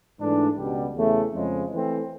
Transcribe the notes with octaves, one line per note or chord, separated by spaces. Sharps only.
G#2 E3 A3 D4
C#2 B2 G3
E2 C#3 E3 A3
F2 C#3 F3 G#3
E3 A3 C4